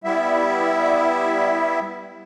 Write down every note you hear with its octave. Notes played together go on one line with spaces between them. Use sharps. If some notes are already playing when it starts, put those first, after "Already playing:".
G3 B3 E4 E5